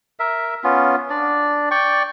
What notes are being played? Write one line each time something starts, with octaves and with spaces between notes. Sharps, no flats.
A#4 E5
B3 C#4 F4
D4 D5
D5 G5 C#6